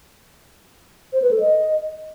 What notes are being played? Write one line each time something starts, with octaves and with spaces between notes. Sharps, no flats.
C5
B4
A4
D#5